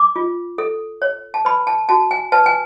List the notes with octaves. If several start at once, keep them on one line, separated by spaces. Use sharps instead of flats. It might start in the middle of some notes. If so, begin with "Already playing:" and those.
Already playing: D6
F4
A4
C#5
A5
B4 B5
A5
F#4 A5
G#5
B4 A5
G#5